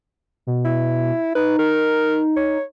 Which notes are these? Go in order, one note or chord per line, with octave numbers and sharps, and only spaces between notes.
B2
E4
D#4 B4
A#4
C#5